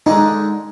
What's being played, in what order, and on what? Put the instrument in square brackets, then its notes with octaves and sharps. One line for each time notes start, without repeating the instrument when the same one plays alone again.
[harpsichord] D3 G#3 D4 [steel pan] D#4